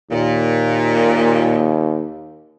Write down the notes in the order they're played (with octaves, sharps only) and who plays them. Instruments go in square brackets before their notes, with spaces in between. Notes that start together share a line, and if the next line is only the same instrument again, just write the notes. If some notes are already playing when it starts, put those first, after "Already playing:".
[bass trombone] D#2 [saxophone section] A#2